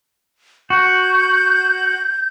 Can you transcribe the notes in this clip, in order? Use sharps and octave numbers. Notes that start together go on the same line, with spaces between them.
F#4 G6